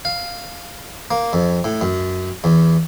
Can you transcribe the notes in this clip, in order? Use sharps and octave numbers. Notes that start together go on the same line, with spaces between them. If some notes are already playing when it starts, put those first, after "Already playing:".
F5
A#3
F2
A2
F#2
E2